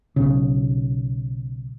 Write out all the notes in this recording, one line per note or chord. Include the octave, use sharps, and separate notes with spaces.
B1 C#3